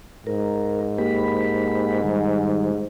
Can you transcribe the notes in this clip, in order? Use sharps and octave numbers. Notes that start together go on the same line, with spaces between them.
G#2 A#4
A#3 G4 B5
D#3 G3